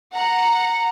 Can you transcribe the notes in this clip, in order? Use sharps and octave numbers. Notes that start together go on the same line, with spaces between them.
F#5 A#5